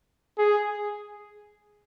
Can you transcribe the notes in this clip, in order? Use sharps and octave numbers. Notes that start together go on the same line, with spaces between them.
G#4